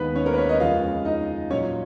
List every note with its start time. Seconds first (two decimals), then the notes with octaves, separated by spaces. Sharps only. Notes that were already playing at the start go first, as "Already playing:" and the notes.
Already playing: D#2 D#3 G#3 B3 B4
0.15 C#4 C#5
0.26 A#3 A#4
0.34 B4
0.38 C#4 C#5
0.49 D#4 D#5
0.60 F2 C#3 G#3 F4 F5
1.05 D#4 D#5
1.50 A#2 F#3 C#4 C#5